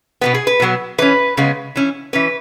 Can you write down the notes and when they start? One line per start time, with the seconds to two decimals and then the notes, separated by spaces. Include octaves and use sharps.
0.21 B2 G#3 B3 B4
0.34 G#4
0.47 B4
0.60 B2 F#3 B3
0.98 E3 C#4 B4
1.37 C#3 G#3 B3
1.76 E3 C#4
2.13 E3 C#4 B4